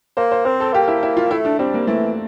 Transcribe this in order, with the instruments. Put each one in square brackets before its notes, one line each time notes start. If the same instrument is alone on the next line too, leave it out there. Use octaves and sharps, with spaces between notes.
[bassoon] A#3 [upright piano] C5
[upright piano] C5
[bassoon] C4 [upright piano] A#4
[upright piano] A4
[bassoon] A#3 [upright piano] G4
[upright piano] E4
E4
F4
[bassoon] A3 [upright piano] E4
[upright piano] D4
[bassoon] G3 [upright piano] C4
[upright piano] A#3
[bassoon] E3 [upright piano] A3